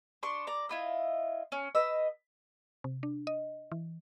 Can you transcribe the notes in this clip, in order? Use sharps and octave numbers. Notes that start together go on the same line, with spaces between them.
D4 C6 C#6
D5 A#5
E4 F4 D#5
C#4
B4 D#5 E6
C3
D4
D#5
E3